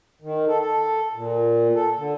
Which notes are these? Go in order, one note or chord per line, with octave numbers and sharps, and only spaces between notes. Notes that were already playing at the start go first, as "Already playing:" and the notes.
D#3
A4
A4
A#2
A4
D3